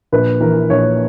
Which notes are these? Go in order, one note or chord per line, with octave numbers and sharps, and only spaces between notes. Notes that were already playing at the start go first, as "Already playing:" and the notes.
A#1 B4
E3 A#4
A#1 C#5